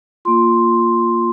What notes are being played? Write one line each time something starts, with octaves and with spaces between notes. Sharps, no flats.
A#3 F4 C6